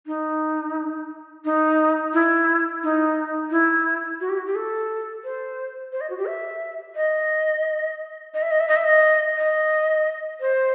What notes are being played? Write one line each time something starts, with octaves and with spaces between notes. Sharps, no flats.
D#4
D#4
E4
D#4
E4
F#4
G4
F#4
G4
A4
C5
C5
D#5
F#4
G4
E5
D#5
D#5
E5
D#5
E5
D#5
E5
D#5
D#5
C5